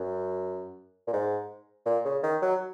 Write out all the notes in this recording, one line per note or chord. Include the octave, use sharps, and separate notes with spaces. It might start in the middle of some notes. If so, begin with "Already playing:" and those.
Already playing: F#2
A#2
G#2
A#2
C#3
D#3
F#3